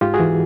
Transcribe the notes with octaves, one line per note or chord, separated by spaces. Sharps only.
G#2 F4 G4
F#4 G#4
E3